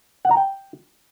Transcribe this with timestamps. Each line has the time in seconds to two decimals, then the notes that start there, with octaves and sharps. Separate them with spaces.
0.25 F#5
0.31 A#5
0.37 G5